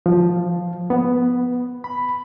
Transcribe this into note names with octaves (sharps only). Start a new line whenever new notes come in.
F3
B3
B5